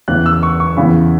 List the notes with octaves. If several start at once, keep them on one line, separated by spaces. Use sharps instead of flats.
E2 C#3 E3 F#6
E6
C#6
C#6
E2 C#3 E3 B5